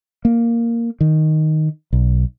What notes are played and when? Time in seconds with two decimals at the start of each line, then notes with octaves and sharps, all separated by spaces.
0.25 A#3
1.01 D#3
1.93 B1